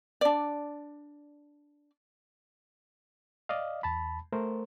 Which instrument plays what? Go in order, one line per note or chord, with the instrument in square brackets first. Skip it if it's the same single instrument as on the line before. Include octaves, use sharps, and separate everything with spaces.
[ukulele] D4 D5
[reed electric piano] D5 D#5 F5
E2 A5 B5
A3 A#4 C5